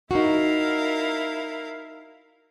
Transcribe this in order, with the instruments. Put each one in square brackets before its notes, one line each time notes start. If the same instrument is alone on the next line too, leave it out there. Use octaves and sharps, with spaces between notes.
[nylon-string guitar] D#4 F#4 [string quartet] E4 A#4 F5